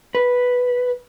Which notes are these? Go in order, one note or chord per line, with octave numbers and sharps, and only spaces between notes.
B4